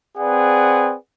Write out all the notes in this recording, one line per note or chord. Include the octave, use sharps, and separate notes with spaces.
C4 G#4 B4 D5 F#5